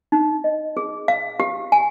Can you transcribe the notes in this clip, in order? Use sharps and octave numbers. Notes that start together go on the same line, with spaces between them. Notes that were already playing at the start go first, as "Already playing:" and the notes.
D#4
D#5
G#4
F5
G4
G#5